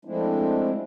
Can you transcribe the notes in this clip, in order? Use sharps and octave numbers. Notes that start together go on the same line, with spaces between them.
F3 G#3 A3 C4 D4 E4